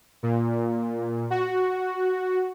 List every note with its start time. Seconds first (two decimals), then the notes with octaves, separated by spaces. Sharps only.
0.23 A#2
1.31 F#4